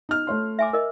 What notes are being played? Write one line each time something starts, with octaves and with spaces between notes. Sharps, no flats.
D#4 F6
A3 C#5 C6
E5 G#5 D6
A#4 D#5